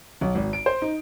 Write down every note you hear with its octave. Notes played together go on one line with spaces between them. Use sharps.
B1
G#1
D7
C5
D#4